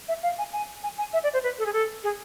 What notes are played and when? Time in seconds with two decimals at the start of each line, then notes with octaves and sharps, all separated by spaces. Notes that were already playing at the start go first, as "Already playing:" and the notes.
0.08 E5
0.23 F5
0.38 G#5
0.53 G#5
0.83 G#5
0.98 G#5
1.13 E5
1.23 D5
1.33 C5
1.43 B4
1.58 A4
1.66 G#4
1.73 A4
2.03 G#4